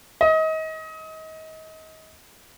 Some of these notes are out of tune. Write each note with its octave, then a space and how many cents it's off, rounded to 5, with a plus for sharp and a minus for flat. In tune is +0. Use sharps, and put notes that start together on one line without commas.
D#5 +30